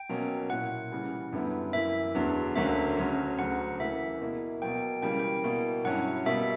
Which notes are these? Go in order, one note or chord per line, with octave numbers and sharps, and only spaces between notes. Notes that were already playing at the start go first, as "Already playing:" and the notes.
Already playing: G5
B2 F#3 A#3 C#4
A#2 A#3 E4 F#5
C#3 E3 G3
F#2 D3 G3 B3 E4
F#2 E3 A#3 E4 E5
E2 D3 F#3 B3 D4
D2 D3 F#3 A#3 C#4 E5
D2 C#3 F#3 C#4
D2 C#3 F#3 F#5
C#3 E3 A#3 E5
B2 A#3 E4
B2 F#3 A#3 G5
C#3 E3 G3 A#3 G5
G5
B2 A#3 E4
G2 F#3 C#4 E4 F#5
B2 G3 A#3 E5